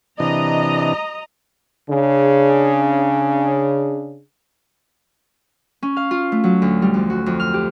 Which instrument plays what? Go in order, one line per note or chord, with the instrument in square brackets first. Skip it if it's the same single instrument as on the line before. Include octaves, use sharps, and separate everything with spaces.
[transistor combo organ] C3 E3 D4 [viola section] D#5 A#5
[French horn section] C#3 D4 G#4
[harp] C#4
F5
F4
A3
F#3
D2
G3
F2
F#4
F2
F6
G4